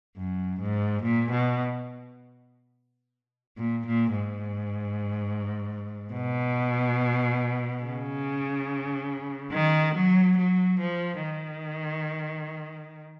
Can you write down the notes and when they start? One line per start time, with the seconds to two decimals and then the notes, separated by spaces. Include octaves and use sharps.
0.17 F#2
0.60 G#2
1.03 A#2
1.31 B2
3.57 A#2
3.86 A#2
4.15 G#2
6.13 B2
7.83 C#3
9.52 D#3
9.95 F#3
10.38 F#3
10.80 F3
11.23 D#3